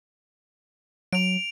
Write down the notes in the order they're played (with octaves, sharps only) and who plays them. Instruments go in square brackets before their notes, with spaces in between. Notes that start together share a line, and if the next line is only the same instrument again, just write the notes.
[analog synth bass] F#3 [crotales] D7 F7